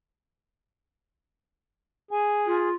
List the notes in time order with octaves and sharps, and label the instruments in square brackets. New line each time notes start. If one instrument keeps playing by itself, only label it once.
[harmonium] G#4 [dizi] G#5
[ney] F4